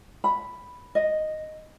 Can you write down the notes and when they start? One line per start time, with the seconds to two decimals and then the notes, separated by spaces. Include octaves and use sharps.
0.24 B5
0.95 D#5